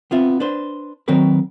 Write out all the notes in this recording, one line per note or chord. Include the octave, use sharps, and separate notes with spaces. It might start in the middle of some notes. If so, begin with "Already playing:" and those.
B3 C4 F4 E5
D4 B4 C5
D#3 F#3 C4 F#4 A#4 B4